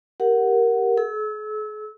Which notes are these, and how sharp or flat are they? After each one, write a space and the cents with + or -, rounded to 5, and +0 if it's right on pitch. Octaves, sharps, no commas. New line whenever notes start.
G4 +0 A#4 +0 F#5 +0
G#4 +45 E6 -25